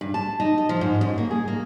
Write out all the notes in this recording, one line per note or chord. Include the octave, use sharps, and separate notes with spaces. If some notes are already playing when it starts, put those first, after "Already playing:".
G2
A5
D#4
D#5
F3
G#2
F#2
A#3
G#4
A#3